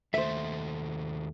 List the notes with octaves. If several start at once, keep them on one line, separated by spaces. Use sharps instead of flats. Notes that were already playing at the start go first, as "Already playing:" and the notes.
D#2 A3 C5 E5